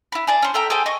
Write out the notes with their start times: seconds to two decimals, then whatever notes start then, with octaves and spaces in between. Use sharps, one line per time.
0.12 E4 B4
0.27 G#4 D5 A5
0.42 C#4 C5
0.54 A4 E5 G5 A#5
0.70 G#4 A4 C5 G5
0.86 D#5 C#6